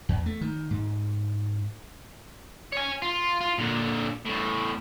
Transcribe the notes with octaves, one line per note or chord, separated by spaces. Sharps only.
E2
A3
D#3
G#2
C#5 G#5
F4
F4
A#2 D3
E2 A2